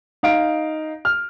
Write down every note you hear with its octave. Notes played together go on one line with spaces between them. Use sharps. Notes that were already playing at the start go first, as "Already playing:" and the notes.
D#4 F5 D7
F6